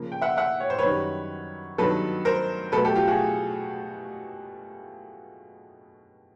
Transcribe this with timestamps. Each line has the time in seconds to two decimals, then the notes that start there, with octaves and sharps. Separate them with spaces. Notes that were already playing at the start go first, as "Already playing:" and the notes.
Already playing: C#3 F3 A#3
0.12 G5
0.22 E5 F#5
0.37 E5 F#5
0.60 C#5
0.70 C5
0.79 B4 C#5
0.84 F#2 D#3 G3
1.78 G2 D#3 F#3 B3 A4 B4
2.25 A#4 C5
2.72 B2 F#3 A3 A4 B4
2.85 G4 A4
2.95 F4 G4
3.08 F#4 G#4